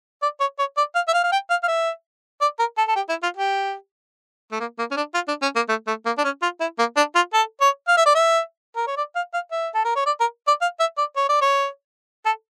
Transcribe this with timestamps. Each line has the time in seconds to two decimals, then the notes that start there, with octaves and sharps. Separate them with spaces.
0.22 D5
0.40 C#5
0.59 C#5
0.77 D5
0.95 F5
1.08 E5
1.13 F5
1.24 F5
1.32 G5
1.50 F5
1.63 F5
1.68 E5
2.41 D5
2.59 A#4
2.78 A4
2.88 A4
2.96 G4
3.09 E4
3.23 F4
3.37 G4
4.52 A3
4.60 A#3
4.79 A#3
4.91 C#4
4.97 D4
5.14 F4
5.28 D4
5.42 C#4
5.56 A#3
5.69 A3
5.87 A3
6.06 A#3
6.18 D4
6.24 C#4
6.42 F4
6.60 E4
6.79 A#3
6.97 D4
7.15 F4
7.33 A4
7.61 C#5
7.88 F5
7.97 E5
8.06 D5
8.15 E5
8.77 A#4
8.87 C#5
8.97 D5
9.16 F5
9.34 F5
9.52 E5
9.74 A4
9.85 A#4
9.96 C#5
10.06 D5
10.20 A#4
10.48 D5
10.61 F5
10.80 E5
10.98 D5
11.16 C#5
11.29 D5
11.41 C#5
12.26 A4